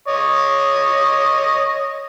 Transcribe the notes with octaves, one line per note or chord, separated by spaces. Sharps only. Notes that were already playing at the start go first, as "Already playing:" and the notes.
C#5 D#5